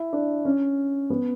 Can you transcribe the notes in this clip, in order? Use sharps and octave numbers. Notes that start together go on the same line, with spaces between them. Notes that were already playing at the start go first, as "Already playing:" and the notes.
Already playing: E4
D4
C#4
B3